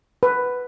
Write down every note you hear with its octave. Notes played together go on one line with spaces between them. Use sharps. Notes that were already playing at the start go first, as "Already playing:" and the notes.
B4